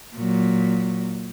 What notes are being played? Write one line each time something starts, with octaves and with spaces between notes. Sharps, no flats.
A#2 F#3